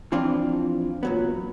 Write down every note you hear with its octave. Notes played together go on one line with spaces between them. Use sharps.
E3 F3 C4 D4 F4
A#2 F#3 B3